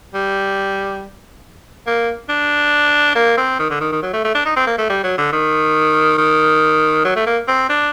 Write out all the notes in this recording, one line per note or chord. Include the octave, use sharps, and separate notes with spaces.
G3
A#3
D4
A#3
C4
D#3
D3
D#3
D#3
F#3
A3
A3
D4
D#4
C4
A#3
A3
G3
F#3
D3
D#3
D#3
F#3
A3
A#3
C4
D4